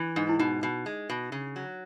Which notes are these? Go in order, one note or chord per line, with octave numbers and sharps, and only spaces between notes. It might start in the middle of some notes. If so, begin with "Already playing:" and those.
Already playing: E3
G#2
E4
B2 D#4
B2
G#3
B2
C#3
F#3